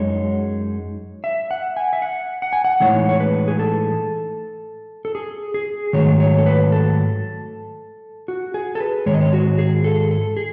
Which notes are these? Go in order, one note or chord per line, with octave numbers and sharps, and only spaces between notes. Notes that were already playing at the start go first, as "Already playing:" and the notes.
Already playing: F#2 G#3 D#4 C#5
E5
F#5
G#5
E5
F#5
F#5
G#5
F#5
A2 E3 G#3 D#4 C#5
C#5
B4
G#4
A4
A4
G#4
G#4
G#2 D#3 F#3 A3 C#5
C#5
A4
B4
A4
F#4
G#4
A4
B4
G#2 D#3 G#3 C#5
D#5
C#5
F#4
G#4
A4
A4
G#4